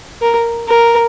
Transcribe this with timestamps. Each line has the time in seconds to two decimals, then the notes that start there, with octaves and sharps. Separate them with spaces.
0.21 A#4
0.68 A#4